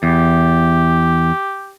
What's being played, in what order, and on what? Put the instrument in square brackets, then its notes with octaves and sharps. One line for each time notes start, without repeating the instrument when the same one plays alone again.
[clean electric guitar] E2 [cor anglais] G4